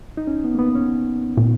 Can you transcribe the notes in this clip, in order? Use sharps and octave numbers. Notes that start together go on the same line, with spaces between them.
D#4
C#4
B3
A#3
B3
C#4
A#2